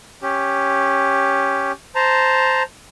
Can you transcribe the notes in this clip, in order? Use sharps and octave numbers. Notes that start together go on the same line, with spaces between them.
C#4 G4
C5 A5 A#5